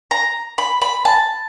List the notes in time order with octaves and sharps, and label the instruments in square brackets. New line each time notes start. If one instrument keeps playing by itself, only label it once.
[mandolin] A#5
B5
B5
A5